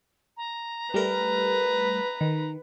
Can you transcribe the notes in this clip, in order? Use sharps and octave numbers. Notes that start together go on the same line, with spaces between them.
A#5
G3 A3 A#4 B4
D#3